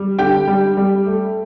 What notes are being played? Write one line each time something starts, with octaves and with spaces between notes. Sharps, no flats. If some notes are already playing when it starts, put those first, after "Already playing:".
Already playing: G3
D3 G4 G5
G3
G3
A3